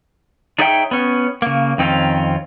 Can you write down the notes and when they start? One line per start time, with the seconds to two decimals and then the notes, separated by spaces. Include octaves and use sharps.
0.59 D4 D#4 G#4 C#5 E5 G5
0.91 B3 C#4
1.42 C#3 A#3
1.78 F2 D#3 C4 C#4 F4